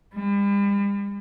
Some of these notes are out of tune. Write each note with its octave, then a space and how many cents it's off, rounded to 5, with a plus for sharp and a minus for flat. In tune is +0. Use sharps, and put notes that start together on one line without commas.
G3 +45